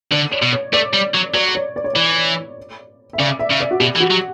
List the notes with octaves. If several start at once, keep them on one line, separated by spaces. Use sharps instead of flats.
D3 D5
C#5
B2
C#5
A3 D5
G3
F#3
F#3 D5
C#5
D5
C#5
E3 D5
E5
C#3 D5
E5
C#3
D5
F#4
B2 G4
E3
F#4
F#3